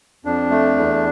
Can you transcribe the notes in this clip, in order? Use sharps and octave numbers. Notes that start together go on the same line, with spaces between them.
F2 D4
A3
E2